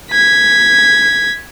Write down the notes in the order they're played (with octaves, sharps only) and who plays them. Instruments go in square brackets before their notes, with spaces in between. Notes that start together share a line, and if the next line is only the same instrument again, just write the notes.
[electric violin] G#6 B6